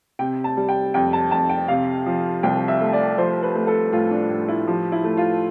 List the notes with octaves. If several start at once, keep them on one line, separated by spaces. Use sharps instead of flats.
C3 G5
A5
G3
G5
F2 G5
A5
F2 A5
G5
C3 F5
F3
C2 G5
E5
A3
D5
F3 C5
B4
A3
A4
A2 F4
D4
A2
E4
F3 G4
E4
A3
F4